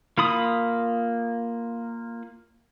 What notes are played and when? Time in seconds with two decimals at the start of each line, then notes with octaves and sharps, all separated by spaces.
0.18 A#3 F4 B5 D#6